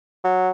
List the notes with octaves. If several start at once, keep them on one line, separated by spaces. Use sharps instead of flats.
F#3